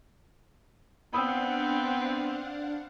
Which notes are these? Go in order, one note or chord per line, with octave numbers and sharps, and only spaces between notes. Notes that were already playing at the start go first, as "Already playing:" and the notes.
B3 C4 D4 F5 F#5 B5 D#6 E6